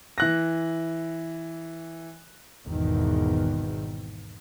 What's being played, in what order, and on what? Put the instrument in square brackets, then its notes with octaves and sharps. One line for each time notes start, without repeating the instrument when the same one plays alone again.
[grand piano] E3 F#6 A#6
[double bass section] G#1 E2 B2 D#3